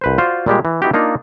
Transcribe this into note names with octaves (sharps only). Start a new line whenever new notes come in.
C2 B4 C5
F4 F#4 C5 D5 F5
A#2 G3 G#3 G4
E3
B3 D#4 E4 F#4 G4
A#3 D4 D#4 F4